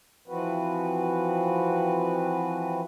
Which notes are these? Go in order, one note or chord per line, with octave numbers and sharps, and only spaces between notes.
E3 F3 C4 F#4 B4